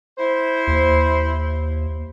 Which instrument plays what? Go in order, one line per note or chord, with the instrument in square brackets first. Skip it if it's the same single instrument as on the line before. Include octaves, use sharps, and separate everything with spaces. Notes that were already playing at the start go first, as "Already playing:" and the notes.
[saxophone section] E4 C5
[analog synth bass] D#2